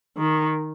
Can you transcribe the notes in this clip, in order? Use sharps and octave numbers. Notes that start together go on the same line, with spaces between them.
D#3